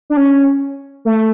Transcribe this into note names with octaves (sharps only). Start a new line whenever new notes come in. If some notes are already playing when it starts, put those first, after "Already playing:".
D4
C#4
A3